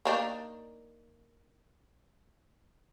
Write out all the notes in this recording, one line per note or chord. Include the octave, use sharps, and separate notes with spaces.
A#3 D4 D#4